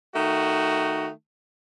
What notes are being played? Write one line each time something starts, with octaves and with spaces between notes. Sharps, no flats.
D#3 A3 F#4